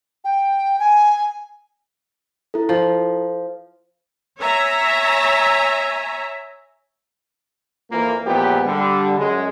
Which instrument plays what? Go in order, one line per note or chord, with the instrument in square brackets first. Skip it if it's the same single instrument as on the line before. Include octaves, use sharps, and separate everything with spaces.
[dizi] G5
G#5
[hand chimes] E4 A4
[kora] F3
[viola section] C#5 E5 G#5 A#5
[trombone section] F2 E3 F3 A#3
E2 A#2 F3 G#3 B3 G4
D3 G3
F#2 G#3